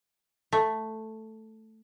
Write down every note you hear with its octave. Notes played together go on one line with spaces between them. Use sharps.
A3